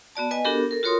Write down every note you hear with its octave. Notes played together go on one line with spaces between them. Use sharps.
B3 F#4 D5 A5
B4 D#5 G#5
B3 D4 F#4 G4 A4 A#4
A4 A#4
F4 F#4 A#4 C#5 C6 D#6